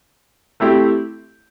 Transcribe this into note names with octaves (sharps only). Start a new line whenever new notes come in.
A3 C4 E4 G4